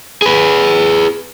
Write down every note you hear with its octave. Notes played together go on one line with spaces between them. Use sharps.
G#4 B4